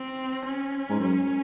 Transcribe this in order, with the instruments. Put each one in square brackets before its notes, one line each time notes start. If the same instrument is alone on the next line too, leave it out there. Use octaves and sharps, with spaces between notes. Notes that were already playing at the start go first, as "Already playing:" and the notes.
Already playing: [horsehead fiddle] C4
C#4
[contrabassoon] G#2
[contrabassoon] F#2 [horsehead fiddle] C#4